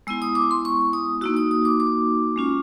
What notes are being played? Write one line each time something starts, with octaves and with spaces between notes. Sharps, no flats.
G#3 B3 E4 E6
D#6
D6
C6
C#6
D#6
A#3 D#4 F#4 E6
D#6
D#6
D6
D6
G#3 C#4 F4